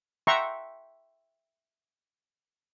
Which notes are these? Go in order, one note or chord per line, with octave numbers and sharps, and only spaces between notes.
E5 F#5 G5 A#5 C6 C#6